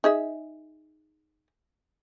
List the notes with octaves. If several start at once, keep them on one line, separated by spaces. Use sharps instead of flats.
D#4 G#4 E5